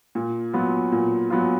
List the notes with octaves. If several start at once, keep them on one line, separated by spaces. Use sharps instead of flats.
A#2
F#3 B3 F4
A#2
F#3 B3 F4